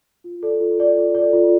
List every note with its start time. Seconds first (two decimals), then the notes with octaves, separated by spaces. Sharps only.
0.24 F4
0.43 A4 D5
0.60 F4
0.79 A4 D5
0.97 F4
1.15 A4 D5
1.33 F4